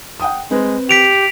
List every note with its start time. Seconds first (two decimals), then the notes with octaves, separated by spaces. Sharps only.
0.20 F#5 G5 D#6
0.51 G#3 C4 B4
0.89 G4 B6 D7 F7